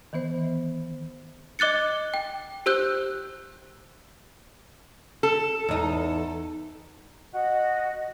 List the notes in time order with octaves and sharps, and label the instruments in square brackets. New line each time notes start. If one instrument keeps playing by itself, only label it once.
[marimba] D#3 E3 B3 C5
[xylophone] D#5 D6 F#6 A6 C#7
G5
G4 C5 E6 F#6 G6
[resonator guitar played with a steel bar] A4
[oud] E2 D#4
[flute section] F#4 D#5